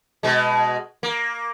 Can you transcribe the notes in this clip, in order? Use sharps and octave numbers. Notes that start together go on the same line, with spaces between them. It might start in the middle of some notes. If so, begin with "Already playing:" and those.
B2 G#3
A#3